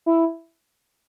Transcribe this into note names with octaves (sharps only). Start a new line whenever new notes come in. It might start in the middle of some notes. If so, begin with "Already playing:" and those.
E4